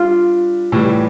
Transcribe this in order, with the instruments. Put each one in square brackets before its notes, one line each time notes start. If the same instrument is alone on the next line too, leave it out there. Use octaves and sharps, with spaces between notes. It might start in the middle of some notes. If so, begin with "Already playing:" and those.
Already playing: [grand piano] G3 D4 [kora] F4
[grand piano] A2 E3 G3